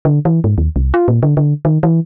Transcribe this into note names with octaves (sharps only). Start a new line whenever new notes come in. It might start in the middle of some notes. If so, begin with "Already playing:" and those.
D3
E3
G#2
D#2
C2
F4
A#2
D3
D3
D#3
E3